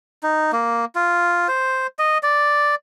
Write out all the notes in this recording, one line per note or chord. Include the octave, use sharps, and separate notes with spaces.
D#4
A#3
F4
C5
D#5
D5